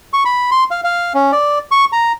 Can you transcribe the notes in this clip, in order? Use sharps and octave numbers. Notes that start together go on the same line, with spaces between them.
C#6
B5
C6
F5
F5
C#4
D5
C#6
A#5